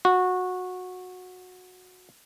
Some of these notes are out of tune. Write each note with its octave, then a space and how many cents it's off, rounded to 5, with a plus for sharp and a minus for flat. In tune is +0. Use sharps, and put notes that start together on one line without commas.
F#4 -15